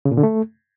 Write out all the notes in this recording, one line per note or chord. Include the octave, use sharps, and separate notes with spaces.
C#3
A#2
D3
A3